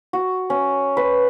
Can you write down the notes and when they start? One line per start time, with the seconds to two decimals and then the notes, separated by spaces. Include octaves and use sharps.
0.13 F#4
0.50 C#4
0.97 B4